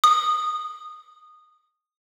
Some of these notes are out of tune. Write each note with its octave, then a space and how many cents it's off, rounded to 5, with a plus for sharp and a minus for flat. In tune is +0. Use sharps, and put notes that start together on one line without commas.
D#6 -15